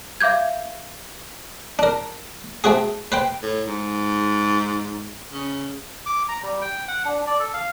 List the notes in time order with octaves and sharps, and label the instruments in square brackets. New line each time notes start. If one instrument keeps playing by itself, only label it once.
[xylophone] E5 F5 D6 G6 G#6
[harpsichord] D4 A#4
A3 C4 F#4 G#4
B4 C5 G5
[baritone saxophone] A2
G#2
C#3
[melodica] D6
A#5
G3
G5
F#5
D4
D5
A4
F5